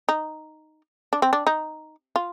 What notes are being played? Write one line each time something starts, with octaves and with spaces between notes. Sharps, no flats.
D#4
D4
C4
D4
D#4
F4